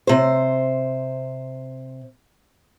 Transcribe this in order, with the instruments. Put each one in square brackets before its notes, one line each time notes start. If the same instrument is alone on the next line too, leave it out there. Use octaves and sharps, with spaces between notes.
[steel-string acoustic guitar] C3 C5